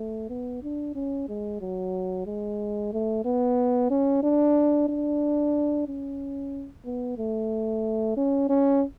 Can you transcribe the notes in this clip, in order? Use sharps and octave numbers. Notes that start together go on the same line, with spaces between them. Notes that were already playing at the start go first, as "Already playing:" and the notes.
Already playing: A3
B3
D4
C#4
G#3
F#3
G#3
A3
B3
C#4
D4
D4
C#4
B3
A3
C#4
C#4